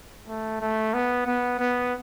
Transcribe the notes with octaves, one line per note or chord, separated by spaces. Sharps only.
A3
A3
B3
B3
B3